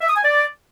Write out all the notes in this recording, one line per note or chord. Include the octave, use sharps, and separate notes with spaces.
E5
D#6
G#5
D5